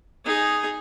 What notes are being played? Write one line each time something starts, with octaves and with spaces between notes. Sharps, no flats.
D#4 G#4